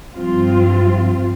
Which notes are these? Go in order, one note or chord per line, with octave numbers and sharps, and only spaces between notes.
G2 F3 C4 F4